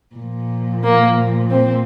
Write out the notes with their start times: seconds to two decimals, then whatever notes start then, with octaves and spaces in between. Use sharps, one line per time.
0.15 A#2 F3
0.83 A#3
1.50 C4